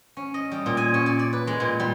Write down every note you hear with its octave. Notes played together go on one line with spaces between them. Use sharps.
C#4
D#5
G3
A#2
G#5
C#4
D5
D5
B4
G#3
A#2
G3